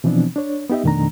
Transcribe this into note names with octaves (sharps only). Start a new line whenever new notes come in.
B2 E3 F3 B3 C4 D4
D4 C#5
B3 D#4 G4 D#5 E5
F2 B2 D#3 A3 D4 A#5